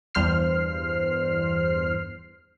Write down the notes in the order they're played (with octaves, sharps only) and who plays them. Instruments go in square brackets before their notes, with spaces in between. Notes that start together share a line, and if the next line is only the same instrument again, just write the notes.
[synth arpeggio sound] E2 G2 C5 F6 C7